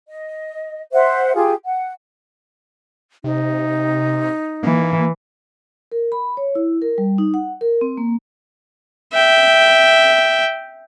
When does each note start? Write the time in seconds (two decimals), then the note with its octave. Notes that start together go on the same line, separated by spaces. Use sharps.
0.08 D#5
0.92 C5 E5 F#5
1.35 F4 G4 G#4
1.65 F#5
3.24 C3 D#4
4.63 E3 A#3
5.92 A#4
6.12 B5
6.37 C#5
6.55 E4
6.82 A#4
6.98 G3
7.18 D#4
7.34 F#5
7.61 A#4
7.81 C4
7.97 A#3
9.13 E5 G5